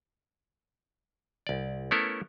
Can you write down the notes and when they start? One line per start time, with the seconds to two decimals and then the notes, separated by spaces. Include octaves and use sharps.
1.47 C2 D5
1.91 A3 B3 C#4 E4 A4 A#4